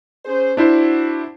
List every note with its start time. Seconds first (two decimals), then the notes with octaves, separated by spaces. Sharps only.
0.25 C#4 G#4 C5
0.57 D4 E4 F#4 C5